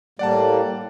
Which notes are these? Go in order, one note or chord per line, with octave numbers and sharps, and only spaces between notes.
A2 G3 A#3 D5 F#5 A5